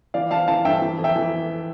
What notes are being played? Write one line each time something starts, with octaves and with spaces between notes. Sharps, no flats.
E3 D5 F5
E3 F5 A5
E3 F5 A5
G2 E5 G5
E3
F2
E5 G5
E3